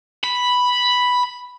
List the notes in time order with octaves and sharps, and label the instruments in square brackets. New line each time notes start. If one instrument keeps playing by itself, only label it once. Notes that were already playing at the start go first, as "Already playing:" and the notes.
[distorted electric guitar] B5